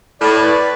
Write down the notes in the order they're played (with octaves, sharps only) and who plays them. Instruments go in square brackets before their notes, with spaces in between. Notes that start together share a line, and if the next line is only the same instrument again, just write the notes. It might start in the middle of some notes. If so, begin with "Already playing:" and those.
[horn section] A2 [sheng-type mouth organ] D5
[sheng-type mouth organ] B4